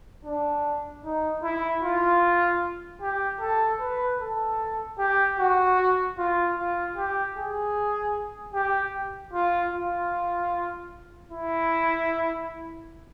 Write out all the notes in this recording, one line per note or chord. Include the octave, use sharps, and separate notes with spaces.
D4
D#4
E4
F4
G4
A4
B4
A4
G4
F#4
F4
F4
G4
G#4
G4
F4
F4
E4